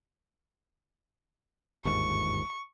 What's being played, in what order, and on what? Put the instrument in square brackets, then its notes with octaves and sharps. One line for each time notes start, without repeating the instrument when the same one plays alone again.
[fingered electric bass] G1 D#2 G#2 [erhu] C#6